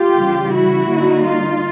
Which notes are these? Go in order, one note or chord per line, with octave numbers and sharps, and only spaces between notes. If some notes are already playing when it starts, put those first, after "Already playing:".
Already playing: F4 G4
C#3 E3 G3
E4 F#4
D3 G3 A#3 D#4
F4